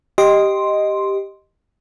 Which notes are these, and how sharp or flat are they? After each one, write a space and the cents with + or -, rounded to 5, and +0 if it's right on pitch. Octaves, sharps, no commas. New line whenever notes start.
G4 +0 D#5 +0 C6 +0